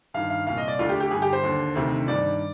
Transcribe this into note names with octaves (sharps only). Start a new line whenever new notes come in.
G2 D#3 F5
F5
C2 A#2 F5
D#5
D5
D2 D3 F4
G4
G4
G2 D3 G#4
G4
C5
D#2 D3
D2 C3 D#3
G2 D#3 D5